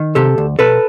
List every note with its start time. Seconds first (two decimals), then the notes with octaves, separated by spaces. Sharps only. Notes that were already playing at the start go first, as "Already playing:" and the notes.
Already playing: D#3
0.15 C3 G4 A4
0.38 D2
0.59 B2 A4 B4